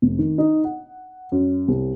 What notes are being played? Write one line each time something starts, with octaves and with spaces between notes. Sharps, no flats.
F1
D#3
D#4
F#5
F#2
C2